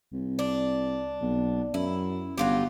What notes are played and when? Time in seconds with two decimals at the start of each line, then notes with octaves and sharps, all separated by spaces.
0.12 C2
0.39 D4
1.21 B1
1.74 F#2 E4
2.38 G1 F#3 F4 G4